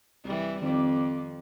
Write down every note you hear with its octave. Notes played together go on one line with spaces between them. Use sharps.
C2 E3 G3
F2 D#3 C4 D6